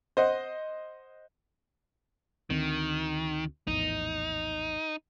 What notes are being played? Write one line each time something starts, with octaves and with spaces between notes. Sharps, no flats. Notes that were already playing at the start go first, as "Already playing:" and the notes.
C5 D#5 F#5
D2 D#3 C4
A#1 E2 A2 D#4